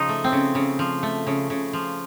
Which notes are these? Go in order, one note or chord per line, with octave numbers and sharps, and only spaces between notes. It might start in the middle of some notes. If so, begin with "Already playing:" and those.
Already playing: C#3 F3 D#4
A3
C4
C#3
C#3
F3
A3
C#3
C#3
F3